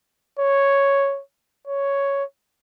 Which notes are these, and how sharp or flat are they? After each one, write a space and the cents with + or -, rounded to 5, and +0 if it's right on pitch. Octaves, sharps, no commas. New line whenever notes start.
C#5 +0
C#5 +5